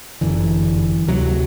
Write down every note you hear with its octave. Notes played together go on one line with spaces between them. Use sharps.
G1 F#2 D3 E3
D2 C3 F#3